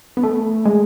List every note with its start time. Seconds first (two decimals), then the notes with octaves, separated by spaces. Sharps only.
0.17 B3
0.23 A3
0.65 G#3